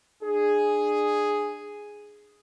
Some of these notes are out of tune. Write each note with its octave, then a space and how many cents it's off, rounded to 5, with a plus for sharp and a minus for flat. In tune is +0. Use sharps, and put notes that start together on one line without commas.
D4 +30 G#4 +0